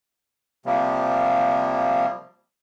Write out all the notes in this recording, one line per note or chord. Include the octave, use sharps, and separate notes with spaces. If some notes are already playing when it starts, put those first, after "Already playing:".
C3 F3 G3 A#3